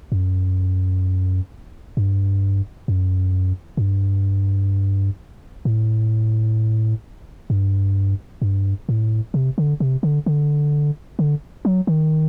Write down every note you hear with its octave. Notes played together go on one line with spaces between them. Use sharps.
F#2
G2
F#2
A2
G2
A2
G2
G2
A2
C3
D3
C3
D3
D3
D3
F#3
D#3